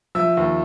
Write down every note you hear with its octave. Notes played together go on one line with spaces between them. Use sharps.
F3 E5 E6
D#2